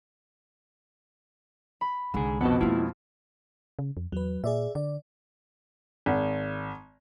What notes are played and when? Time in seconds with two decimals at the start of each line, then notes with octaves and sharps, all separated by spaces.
1.81 B5
2.14 C2 G#2 D3 G#4
2.41 F2 B2 B3 D#5 F#5 A5
2.61 G#3 A#3 E4 F4
3.79 C#3
3.97 F2
4.12 E2 F#3 B4
4.44 A#2 G#4 D5 E5
4.75 D3 D5
6.06 G#1